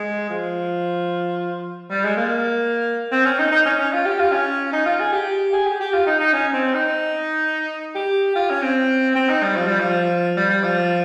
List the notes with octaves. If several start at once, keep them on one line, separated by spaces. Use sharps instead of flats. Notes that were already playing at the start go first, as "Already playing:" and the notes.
Already playing: G#3
F3
G3
G#3
A#3
C4
C#4
D#4
D#4
C#4
C#4
F4
G4
F4
C#4
D#4
F4
G#4
G4
G#4
G4
G4
F4
D#4
D#4
C#4
C4
D#4
G4
F4
C#4
C4
C4
D#4
G3
F3
G3
F3
G3
G3
F3